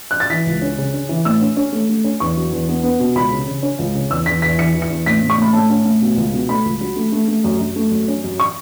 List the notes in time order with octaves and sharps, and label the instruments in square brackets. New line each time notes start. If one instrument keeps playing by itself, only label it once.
[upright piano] F#6
A6
E3 B6
C#2
C#4
C#3
C#4
E3
A2 E6
C#4
C#4
A3
A3
C#4
E2 C#6
F#3
E2
B3
B3
B2
C#2 B5
C#3
C#3
C#4
C#2
C#3
E2 E6
E2 B6
E2 B6
E3 C#7
E3
C#7
E2
A2 B6
A2
C#6
A2 B5
A2 A5
C#4
A2
B2
C#2
B2
A3 B5
C#2
F#3
A3
A3
A3
F#2
F#2
A3
F#2
C#4
F#2
C#6